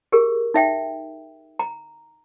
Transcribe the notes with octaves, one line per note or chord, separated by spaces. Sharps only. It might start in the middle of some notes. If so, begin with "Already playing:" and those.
G4 G#4 A#4
D#4 E5 G5
A#5